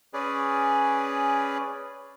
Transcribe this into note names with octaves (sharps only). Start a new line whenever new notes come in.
C#4 G#4 B4 D5